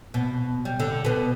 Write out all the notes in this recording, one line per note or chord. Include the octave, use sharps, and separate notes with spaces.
B2
G3
D3
B2 B3